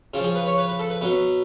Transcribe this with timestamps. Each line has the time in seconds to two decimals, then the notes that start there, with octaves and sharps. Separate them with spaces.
0.14 C#3 F3 F4
0.24 G#4
0.35 B4
0.46 C#5
0.58 B4
0.68 B4
0.79 A4
0.90 B4
1.01 B2 F#3 B4